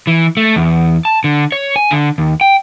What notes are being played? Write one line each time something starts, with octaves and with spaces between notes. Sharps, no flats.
E3
A3
E2
A5
D3
C#5
G#5
D3
D#2
G5